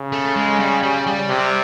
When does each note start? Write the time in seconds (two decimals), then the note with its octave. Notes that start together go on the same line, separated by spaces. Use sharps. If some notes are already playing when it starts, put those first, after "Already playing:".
Already playing: C#3
0.12 A3
0.36 G#3
0.60 G3
0.83 G3
1.07 G3
1.29 C3